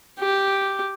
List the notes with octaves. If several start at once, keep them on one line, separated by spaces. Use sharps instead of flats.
G4